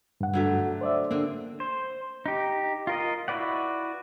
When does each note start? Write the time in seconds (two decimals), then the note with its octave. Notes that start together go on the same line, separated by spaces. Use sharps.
0.21 G2 F#5
0.34 D3 F#3 A3
0.81 C5 D5 E5
1.11 D3 A#3 C4
1.60 C5
2.26 D#4 G4
2.87 F4 A#4 D#5
3.28 E4 F#4 B4 D5 F#5